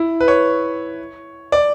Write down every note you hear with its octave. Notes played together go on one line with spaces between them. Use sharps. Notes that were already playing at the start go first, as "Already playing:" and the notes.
Already playing: E4
B4
C#5
D5